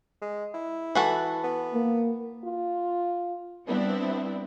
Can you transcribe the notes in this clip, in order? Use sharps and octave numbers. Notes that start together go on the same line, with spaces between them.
G#3
E4
E3 F#4 A4
B3
A#3
F4
G3 B3 C4 D4 E4